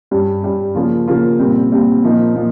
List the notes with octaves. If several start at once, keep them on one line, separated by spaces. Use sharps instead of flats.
G2 G3 C#4
G2 G3 C#4
C#3 F3 A#3 C#4 F4
C#3 F3 A#3 C#4 F4
A#2 G3 C4
A#2 G3 C4
A#2 F3 A#3 D#4
A#2 F3